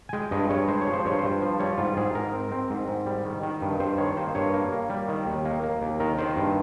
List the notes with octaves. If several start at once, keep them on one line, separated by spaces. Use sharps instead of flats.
G#5
G#3 G5
G2 D#5
G2 C#5
G#3 C5
C#5
F3
C5
G2 C#5
G2 C5
F3
G3 C#5
G#2 F4
G#2 G#4
G#2 A#4
C4
C4
G#2
G#2
G3
D#3
D#3
G2
G2 C5
D#3 C#5
A#3 C5
G2 C#5
A#3
A#3
G3
D#3
D#2
A#3
A#3
D#2
D#3 A#4
D#3 C5
G2